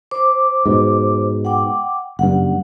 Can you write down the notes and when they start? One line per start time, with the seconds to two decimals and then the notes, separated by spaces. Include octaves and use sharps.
0.11 C5 D6
0.66 G#2 B2
1.45 F#5 G5 D6
2.19 F#1 G2 F#5